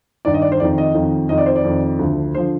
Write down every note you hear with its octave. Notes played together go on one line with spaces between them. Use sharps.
G2 D#3 D5
D#5
D5
C5
F2 D#3 D5
D#5
F2 D#3
F2 D#3 D#5
D5
C5
D5
F2
D#3
D2 D3 F3
D3 F3 C5